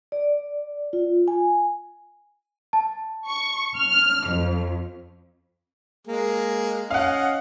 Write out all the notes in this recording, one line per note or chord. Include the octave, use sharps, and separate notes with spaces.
D5
F4
G#5
A5
C#6
F6
F2
G#3 A#3 G#4
C#4 D#5 F5 F#5